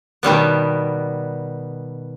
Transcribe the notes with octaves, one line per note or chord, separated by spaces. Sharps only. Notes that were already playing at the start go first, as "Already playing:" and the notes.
B2 D#3 G3 B3